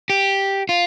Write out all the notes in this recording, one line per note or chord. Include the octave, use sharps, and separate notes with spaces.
G4
F4